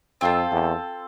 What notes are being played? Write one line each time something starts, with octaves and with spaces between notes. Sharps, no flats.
F2 C4 F4 A4
E2